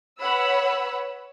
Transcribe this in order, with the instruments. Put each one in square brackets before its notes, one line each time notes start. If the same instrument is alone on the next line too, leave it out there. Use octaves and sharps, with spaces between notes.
[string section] B4 C#5 F#5 B5 E6